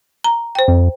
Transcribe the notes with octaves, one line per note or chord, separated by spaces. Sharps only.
A#5
C5 G5
F2